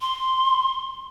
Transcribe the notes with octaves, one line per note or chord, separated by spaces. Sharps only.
C6